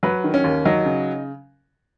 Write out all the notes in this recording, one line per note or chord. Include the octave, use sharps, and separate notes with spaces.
F#3 B4
D#3
C#4
D#2
F#3 D#4
C#3